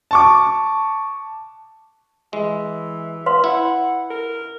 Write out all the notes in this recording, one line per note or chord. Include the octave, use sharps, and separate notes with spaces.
A5 C#6 D6
E3 G#3
B4 F5 C6
E4 F#5
A#4